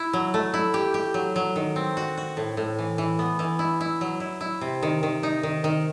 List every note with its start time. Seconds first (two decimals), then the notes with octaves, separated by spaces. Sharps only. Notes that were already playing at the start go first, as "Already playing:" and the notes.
Already playing: E4
0.13 F#3
0.34 A3
0.54 E4
0.74 G4
0.94 G4
1.14 F#3
1.36 F#3
1.56 D#3
1.76 C4
1.97 F#4
2.17 F#4
2.37 A2
2.57 A2
2.79 E3
2.98 E3
3.19 B3
3.39 E3
3.59 E4
3.81 E4
4.01 F#3
4.20 E4
4.41 E4
4.61 C3
4.83 D#3
5.03 D#3
5.23 D#4
5.43 D#3
5.64 D#3